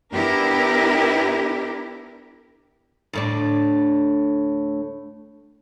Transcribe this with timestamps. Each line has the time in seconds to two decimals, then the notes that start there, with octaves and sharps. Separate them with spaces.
0.13 B3 D4 E4 G4 A#4
3.13 D2 A2 D4